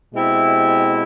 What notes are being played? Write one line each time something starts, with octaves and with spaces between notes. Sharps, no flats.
B2 G#3 C4 E4 G4